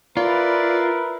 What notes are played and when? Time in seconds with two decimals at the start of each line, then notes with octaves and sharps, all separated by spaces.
0.17 E4 F4 A#4 B4 D5